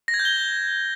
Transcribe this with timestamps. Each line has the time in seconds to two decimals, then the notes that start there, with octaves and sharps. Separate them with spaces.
0.08 A#6
0.14 G#6
0.19 G6
0.25 G7